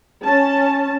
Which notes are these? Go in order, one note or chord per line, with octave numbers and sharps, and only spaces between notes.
C#4 A5